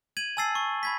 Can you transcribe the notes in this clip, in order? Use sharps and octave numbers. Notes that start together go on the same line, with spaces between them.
G#6 D#7 F#7
G#5 A5 E6 A6 C7
C#6
B5 G#6 B6